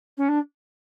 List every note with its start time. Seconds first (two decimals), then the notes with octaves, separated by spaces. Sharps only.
0.17 C#4
0.28 D4